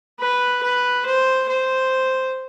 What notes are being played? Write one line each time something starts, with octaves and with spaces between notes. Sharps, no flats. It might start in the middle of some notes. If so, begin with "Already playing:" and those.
B4
B4
C5
C5